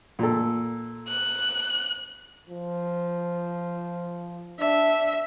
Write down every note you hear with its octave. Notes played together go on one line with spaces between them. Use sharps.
A#2 A4
F#6
F3
D4 E5